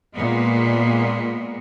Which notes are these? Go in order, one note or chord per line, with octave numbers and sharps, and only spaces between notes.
A#2 G#3 B3